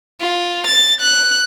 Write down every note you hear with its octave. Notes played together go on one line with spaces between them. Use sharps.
F4
A6
F#6